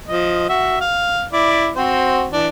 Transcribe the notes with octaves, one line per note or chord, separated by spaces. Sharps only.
F3 D#5
F#4 E5
F5
E4 D5
C4 F#4 C5
E3 D4